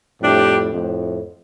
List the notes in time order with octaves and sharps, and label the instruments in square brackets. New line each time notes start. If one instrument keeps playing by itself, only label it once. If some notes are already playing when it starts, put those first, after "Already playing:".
[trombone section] F2 A2 [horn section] G3 D4 G4
[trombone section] F2 A2